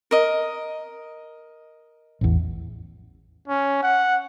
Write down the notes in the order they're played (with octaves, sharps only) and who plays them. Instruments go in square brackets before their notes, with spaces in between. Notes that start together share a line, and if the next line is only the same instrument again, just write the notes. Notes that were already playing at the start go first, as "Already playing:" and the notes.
[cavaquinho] A#4 D#5
[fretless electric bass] A1 E2
[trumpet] C#4
F#5